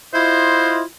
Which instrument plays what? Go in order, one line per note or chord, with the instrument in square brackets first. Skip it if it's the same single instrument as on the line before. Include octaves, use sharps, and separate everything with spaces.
[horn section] E4 F4 D#5 [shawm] C5